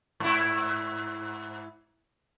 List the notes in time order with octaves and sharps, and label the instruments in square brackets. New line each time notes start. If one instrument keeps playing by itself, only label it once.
[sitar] G#2 E4